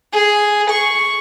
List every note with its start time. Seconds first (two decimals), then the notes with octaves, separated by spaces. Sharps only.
0.13 G#4
0.71 C#6